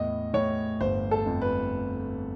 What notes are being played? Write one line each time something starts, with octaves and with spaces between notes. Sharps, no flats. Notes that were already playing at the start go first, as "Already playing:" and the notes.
Already playing: E2 A2 D#5
A2 C#5
G1 C5
A4
F2
B4